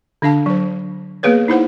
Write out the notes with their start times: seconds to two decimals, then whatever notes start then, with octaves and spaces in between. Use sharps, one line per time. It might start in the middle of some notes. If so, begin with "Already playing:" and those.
0.22 D3 D4 F5 A5
0.46 F#3 C5
1.23 A#3 B3 G#4 B4 C#5
1.48 D#4 E4 C5 F#5